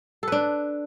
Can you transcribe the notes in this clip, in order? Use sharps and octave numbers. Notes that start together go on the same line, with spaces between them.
D4 A4 B4